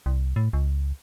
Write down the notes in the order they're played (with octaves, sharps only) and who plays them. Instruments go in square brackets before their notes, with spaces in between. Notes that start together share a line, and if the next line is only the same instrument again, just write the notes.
[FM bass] C2
A2
C#2